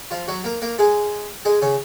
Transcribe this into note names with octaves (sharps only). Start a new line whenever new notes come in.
F3 F4
F#3 F#4
A#3 A#4
A#3 A#4
G#3 G#4
G#3 G#4
C#3 C#4